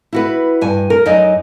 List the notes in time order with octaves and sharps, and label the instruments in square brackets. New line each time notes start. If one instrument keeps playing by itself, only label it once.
[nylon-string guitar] E4 F#4 B4
G2 G#5
A#4
F#2 D#4 D#5